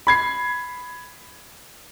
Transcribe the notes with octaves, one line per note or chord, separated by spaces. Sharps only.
B5 G#6 C7